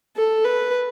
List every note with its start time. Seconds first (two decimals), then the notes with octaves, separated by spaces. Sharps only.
0.16 A4
0.45 B4